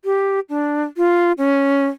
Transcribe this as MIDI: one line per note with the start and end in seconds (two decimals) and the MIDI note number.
0.05 0.40 67
0.49 0.84 62
0.97 1.32 65
1.38 1.87 61